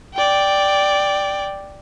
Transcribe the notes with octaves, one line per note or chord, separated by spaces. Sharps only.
D5 G5